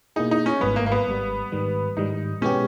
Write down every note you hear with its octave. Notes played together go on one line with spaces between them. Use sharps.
B2 A#3 D#4 E4 G#4
D#4
C#4
G#1 G#2 G3 B3
A#3
A#3
B3
G#1 G#2 G3
G#2 D#3 G3
G#2 D#3 G3 D#4
B2 G#3 B3 C#4 G4